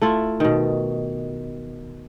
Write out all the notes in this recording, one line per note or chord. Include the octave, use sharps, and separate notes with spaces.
A3 E4 F4
B2 D#3